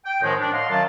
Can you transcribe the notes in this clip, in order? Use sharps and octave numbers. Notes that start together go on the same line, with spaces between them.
G5
F#2 A2 D#3 F3 G#3
D4
C#5 D#5 F5 F#5 C6
F#2 D#3 F#3 F5 A5